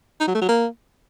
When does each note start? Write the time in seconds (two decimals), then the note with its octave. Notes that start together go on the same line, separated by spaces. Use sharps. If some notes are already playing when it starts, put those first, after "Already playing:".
0.20 D#4
0.27 F#3
0.34 A3
0.41 F#3
0.48 A#3